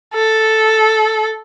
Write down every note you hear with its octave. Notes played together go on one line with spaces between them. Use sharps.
A4